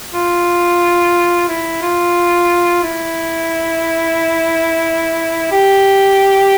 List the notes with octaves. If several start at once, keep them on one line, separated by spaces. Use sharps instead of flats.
F4
E4
F4
E4
G4